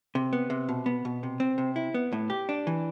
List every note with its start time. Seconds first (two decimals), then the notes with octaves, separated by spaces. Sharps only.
0.15 C3
0.33 B3
0.50 C3
0.69 B2
0.86 B3
1.05 B2
1.23 C3
1.40 C4
1.58 C3
1.76 E4
1.94 B3
2.12 A2
2.30 G4
2.49 D4
2.67 E3